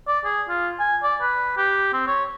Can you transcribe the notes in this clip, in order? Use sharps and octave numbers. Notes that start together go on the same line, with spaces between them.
D5
G#4
F4
G#5
D5
B4
G4
C4
C#5